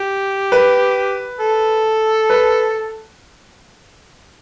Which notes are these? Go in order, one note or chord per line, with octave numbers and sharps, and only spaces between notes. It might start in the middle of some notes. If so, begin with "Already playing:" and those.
Already playing: G4
B4
A4
B4